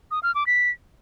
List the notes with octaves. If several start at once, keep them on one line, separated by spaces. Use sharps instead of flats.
D#6
F6
D6
B6